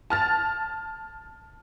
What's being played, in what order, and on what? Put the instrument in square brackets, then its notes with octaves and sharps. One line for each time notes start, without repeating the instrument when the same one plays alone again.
[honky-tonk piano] A5 F6 A6